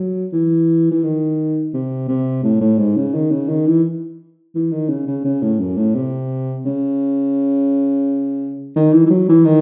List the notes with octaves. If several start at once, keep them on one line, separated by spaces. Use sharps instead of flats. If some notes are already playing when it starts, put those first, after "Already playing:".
Already playing: F#3
E3
E3
D#3
C3
C3
A2
A2
G#2
C#3
D#3
C#3
D#3
E3
E3
D#3
C#3
C#3
C#3
A2
F#2
A2
C3
C#3
D#3
E3
E3
F#3
E3
D#3